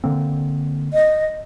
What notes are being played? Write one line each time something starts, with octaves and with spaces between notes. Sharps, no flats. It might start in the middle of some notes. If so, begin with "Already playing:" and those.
D3 A#3 C4
D#5